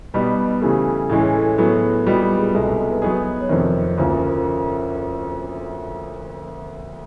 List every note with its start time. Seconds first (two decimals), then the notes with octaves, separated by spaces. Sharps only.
0.14 B2 G3 B3 D#4 G4
0.61 C#3 E3 A3 G4
1.10 A2 E3 G#3 C#4
1.21 G#4
1.34 A4
1.46 A4
1.58 A2 F#3 B3 A4
2.06 A#2 G3 B3 D#4 F#4
2.22 G4
2.39 G#4
2.54 C2 B2 G#3 A4
2.65 A4
2.78 A4
2.90 B4
3.02 F#3 B3 D#4 G#4
3.41 C#5
3.49 F2 C3 D#3 C5
3.98 D2 C#3 F3 A#3 C#4 C#5